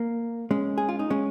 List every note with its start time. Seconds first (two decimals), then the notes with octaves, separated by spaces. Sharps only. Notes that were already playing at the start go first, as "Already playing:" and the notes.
Already playing: A#3
0.51 G#3 C#4
0.78 G#4
0.89 F4
0.99 D#4
1.10 G#3 C#4